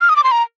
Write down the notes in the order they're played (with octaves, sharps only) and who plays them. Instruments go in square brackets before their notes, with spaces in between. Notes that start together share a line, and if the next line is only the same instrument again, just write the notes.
[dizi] F6
D#6
D6
C6
A#5